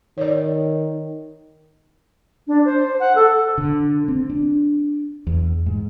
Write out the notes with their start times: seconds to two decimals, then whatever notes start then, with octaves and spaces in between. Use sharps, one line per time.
0.18 D#3 C#5 D5
2.48 D4
2.65 C5
3.00 F#5
3.15 A4
3.58 D3
4.08 C4
4.30 D4
5.27 E2
5.66 G#2